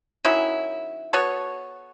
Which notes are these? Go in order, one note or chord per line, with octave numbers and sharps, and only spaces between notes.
D#3 F#3 C#4 E4
B3 F#4 A4 C#5